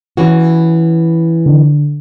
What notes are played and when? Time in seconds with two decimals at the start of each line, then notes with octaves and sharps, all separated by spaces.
0.17 E3 C#4 F#4
1.46 D3